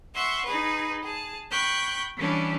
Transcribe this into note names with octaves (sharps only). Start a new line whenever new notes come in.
E5 F#5 C6 C#6
D#4 G#4 B4
G#4 A5
G5 B5 C#6 F#6 G6
E3 G3 C#4 D4